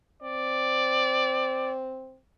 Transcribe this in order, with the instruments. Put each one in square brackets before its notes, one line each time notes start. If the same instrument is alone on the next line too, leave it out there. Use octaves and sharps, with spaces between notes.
[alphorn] C4 [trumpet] D5